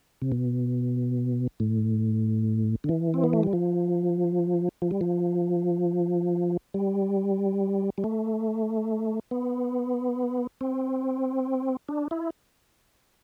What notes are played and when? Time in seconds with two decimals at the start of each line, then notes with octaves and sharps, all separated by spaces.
0.22 C3
0.32 B2
1.60 A2
2.84 D3
2.89 E3
3.14 C4
3.24 B3
3.33 A3
3.43 G3
3.53 F3
4.82 F3
4.91 G3
5.01 F3
6.74 G3
7.98 G3
8.04 A3
9.31 B3
10.61 C4
11.88 D4
12.11 E4